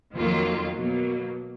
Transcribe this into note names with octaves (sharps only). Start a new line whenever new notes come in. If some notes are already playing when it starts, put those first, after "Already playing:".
F2 D#3 F#3 A#3 F4
B2 F#3 A#3